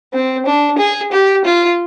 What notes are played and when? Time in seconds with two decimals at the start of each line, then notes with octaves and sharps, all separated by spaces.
0.13 C4
0.46 D4
0.78 G#4
1.12 G4
1.44 F4